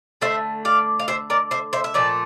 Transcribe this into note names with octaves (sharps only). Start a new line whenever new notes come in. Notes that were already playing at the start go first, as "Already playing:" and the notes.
D3 A3 C5 E5
D5 F5
F5
C5 E5
A#4 D5
C5 E5
C5 E5
E5
A#2 F3 A3 D5